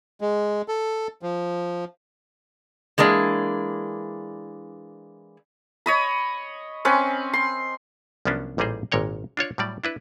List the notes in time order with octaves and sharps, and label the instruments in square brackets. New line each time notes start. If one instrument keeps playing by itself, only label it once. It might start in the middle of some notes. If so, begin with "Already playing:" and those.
[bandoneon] G#3
A4
F3
[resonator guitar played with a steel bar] E3 G#3 A#3 D4
[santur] C#5 D#5 B5
C4 C#4 B4
C6
[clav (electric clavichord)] C2 F3 F#3 B3 C#4 D4
A1 A#2 G3 D#4 G#4 C5
G#1 A#2 A#4 C#5 G5
D4 F4 C#5 D5
A2 F#3 G3 D5
D4 E4 B4